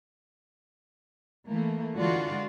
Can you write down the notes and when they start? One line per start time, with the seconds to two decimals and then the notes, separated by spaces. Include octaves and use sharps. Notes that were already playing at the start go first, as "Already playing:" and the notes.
1.47 E3 A3 A#3
1.96 D3 E3 G#3 F4 F#4 D5